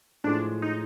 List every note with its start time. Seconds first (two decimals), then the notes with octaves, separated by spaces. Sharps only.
0.24 A2 F3 G#3 D4
0.62 D#4